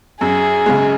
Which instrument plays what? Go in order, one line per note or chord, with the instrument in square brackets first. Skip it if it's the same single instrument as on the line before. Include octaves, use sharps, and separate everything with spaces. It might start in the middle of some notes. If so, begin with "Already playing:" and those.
[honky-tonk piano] F#2 [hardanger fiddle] G#4
[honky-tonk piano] C#3 G#3